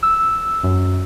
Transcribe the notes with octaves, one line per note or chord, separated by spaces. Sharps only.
E6
F#2